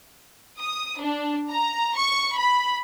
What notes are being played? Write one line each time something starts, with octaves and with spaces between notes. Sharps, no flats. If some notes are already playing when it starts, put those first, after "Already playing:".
D#6
D4
A#5
C#6
B5